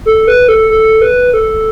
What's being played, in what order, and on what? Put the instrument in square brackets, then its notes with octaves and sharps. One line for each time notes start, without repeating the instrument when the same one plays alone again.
[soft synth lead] A4
B4
A4
A4
B4
A4